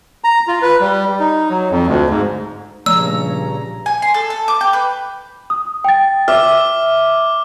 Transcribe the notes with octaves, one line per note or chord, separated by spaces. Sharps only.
A#5
F4
B4
G3
D#4
F#3
F2
D2
G#2
G2 A#2 C#3 F3 A#5 E6
G#5
C6
A4
A4
D6
G5
B4
D#6
G5 A6
E5 D6 F6